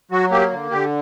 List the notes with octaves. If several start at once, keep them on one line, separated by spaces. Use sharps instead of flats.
F#3 F#4
A#3 G4
D3
D3 G4